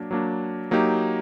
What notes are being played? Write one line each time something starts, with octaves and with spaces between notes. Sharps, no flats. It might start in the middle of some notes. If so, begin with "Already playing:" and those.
Already playing: F#3 A#3 D4
F#3 A#3 D4
F#3 A#3 D#4 G4